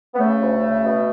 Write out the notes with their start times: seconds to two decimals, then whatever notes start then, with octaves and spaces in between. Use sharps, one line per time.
0.15 B3
0.19 C#3 A3
0.40 D2
0.61 C#3
0.83 B2